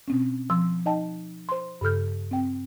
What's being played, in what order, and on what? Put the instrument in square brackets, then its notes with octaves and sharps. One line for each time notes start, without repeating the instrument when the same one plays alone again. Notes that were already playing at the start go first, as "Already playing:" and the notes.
[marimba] B2 C4 C#4
F3 C6 E6
D#4 D#5 G5 A5
C5 C6
G2 C#3 A4 F6 G6
C4 G5